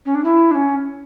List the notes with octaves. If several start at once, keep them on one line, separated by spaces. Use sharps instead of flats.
C#4
D4
E4
D4
C#4